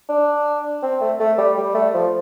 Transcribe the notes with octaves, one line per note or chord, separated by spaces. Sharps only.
D4
C4
A3
A3
G3
G3
A3
F3